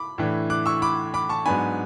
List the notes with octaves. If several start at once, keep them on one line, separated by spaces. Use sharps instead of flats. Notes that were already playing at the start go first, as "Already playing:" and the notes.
Already playing: B5 D6
A2 E3 A3 D4
D6 F#6
C#6 E6
B5 D6
B5 D6
A5 C#6
G#2 F#3 B3 D4 G#5 B5